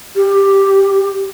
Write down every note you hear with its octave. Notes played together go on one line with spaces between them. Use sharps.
G4